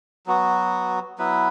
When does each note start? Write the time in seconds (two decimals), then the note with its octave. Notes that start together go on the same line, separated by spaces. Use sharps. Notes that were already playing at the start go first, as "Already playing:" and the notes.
0.26 F#3 B3 F#4
1.18 F#3 B3 E4 B4